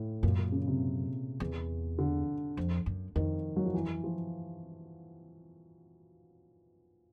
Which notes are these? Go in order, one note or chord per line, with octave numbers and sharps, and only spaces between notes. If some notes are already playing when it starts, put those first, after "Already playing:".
Already playing: A2
F#2 A#2
A#2
C#3
C3
E2
D3
F2
F#2
F2 D#3
F#3
F3
E3
F3